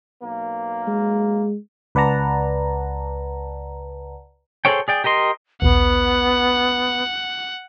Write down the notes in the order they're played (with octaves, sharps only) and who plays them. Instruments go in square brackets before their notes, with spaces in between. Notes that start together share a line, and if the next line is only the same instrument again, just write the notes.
[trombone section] B1 A#3
[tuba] G#3
[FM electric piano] C#2 B4 D5 F#5 A5 A#5
[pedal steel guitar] G#4 A4 C5 C#5 G5
G#4 D5 G5
G4 A#4 D#5 C6
[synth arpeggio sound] A#1 D#2 [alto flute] B3 [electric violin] F#5